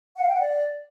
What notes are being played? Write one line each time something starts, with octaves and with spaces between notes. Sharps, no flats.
F#5
F5
G5
F#5
D5